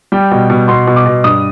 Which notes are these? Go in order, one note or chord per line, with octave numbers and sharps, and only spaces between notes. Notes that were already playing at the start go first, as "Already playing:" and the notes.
G3 G5
B2
B2
B2 C6
B2
D6
B2
G2 D#6